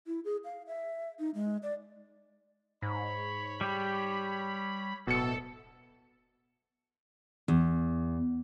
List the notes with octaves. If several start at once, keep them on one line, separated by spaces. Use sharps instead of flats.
E4
G#4
F5
E5
D#4
G#3
D5
G#2 C#5 B5
G3 G4
D1 B2 A4 C#7
E2